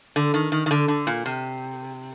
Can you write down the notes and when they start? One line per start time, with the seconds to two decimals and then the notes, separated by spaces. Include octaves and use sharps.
0.16 D3
0.34 D#3
0.52 D#3
0.66 D#3
0.71 D3
0.88 D3
1.07 A#2
1.26 C3